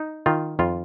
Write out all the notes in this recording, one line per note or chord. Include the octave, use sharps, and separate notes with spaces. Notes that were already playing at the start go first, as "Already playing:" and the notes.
Already playing: D#4
D#3 F4
F2 F4